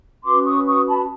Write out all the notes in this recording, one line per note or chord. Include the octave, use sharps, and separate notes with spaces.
C#4 F#4 B4 C6 D6
C#6 D#6
C#6 D#6
A5 B5